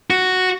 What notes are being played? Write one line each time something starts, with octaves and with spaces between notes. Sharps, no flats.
F#4